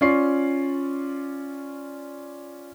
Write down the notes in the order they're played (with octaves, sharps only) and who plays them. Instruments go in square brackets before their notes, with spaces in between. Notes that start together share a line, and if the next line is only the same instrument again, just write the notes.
[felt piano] C#4 F4 D5 C#6 C7